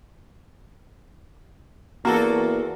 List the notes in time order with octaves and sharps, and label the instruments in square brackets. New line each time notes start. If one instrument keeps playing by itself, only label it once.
[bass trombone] E2 [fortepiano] A#3 [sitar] F#4 A4